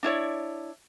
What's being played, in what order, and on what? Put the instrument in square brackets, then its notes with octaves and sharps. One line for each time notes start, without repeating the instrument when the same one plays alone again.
[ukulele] D4 E4 C#5 D5